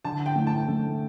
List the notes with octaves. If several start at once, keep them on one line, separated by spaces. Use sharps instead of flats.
D3 A5
G5
A3
A5
A3